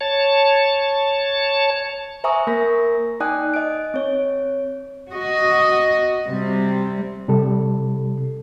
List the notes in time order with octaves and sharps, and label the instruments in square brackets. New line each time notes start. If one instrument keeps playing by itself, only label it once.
[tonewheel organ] C#5 A5
[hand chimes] C5 E5 G#5 A#5 C#6 D#6
A#3 A#4 A#6
D#4 D5 G5 G#5 D#6 F#6
D#5 D7
C4 C#5
[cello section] F#4 D#5
C3 G3
[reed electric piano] C3 G3 A4